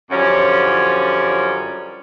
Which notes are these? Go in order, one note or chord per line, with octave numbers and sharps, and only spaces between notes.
F#2 D3 F3 G3 C#4